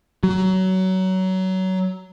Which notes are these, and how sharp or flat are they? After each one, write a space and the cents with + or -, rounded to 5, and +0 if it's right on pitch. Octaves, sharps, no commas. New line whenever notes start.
F#3 +20